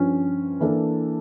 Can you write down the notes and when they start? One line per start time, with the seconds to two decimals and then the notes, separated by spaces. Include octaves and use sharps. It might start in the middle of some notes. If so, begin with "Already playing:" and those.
Already playing: G2 F3 C#4
0.60 E3 A#3 D4 A4